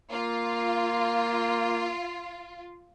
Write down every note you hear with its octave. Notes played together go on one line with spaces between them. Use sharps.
A#3 F4